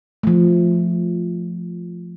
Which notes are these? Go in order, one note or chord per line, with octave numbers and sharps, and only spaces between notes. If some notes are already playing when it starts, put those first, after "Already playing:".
F3 A3